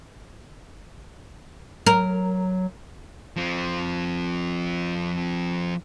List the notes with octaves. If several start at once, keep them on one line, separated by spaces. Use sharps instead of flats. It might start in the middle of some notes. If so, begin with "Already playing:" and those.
F#3 A#4
F3 C4